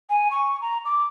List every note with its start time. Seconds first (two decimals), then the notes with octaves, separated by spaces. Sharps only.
0.10 G#5
0.31 C#6
0.61 A#5
0.85 D6